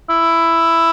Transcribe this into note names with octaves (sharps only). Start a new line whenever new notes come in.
E4